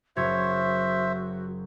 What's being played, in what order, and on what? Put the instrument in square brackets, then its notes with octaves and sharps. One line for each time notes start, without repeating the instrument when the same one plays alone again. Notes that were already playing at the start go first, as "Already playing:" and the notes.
[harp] F#1 C#5 G#6 [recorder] F#4 [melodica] C5 E5